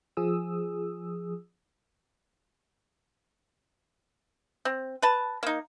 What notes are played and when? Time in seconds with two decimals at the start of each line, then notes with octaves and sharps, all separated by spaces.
0.17 F3 G#4 D#6 E6
4.65 C4
5.02 B4 A5
5.43 A#3 D#4